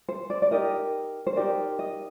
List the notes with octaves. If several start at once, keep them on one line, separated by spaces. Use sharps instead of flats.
C5
D5
D5
D#4 G4 A#4 D#5
C5
D#4 G4 A#4 D5
D#5